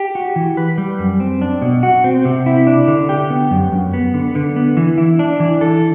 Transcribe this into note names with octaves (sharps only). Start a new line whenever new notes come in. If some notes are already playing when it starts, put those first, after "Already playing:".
Already playing: G4
F#4
E3
B4
G3
F#2
C4
D4
B2
F#4
C4
C3
E4
D4
D3
G4
B3
F#2
F#2
B3
D3
D3
B3
E3
E4
D4
E3
A4